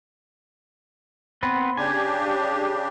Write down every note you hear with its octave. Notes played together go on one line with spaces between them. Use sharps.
B3 C4 B4
C#3 D4 G4 G#5